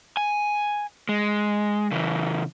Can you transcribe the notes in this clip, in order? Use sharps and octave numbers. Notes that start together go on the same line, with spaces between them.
G#5
G#3
C#3 E3